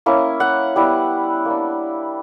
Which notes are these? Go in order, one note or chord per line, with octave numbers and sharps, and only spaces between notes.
A#3 C#4 E4
F#5
G3 B3 E4
A#3 D4